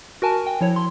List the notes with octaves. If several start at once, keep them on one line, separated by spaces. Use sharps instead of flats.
F#4 A#4 G#5 A5
G5
F3 E4 C#5
C6